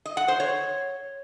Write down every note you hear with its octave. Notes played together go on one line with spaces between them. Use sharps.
D#5
F#5
C5
C#5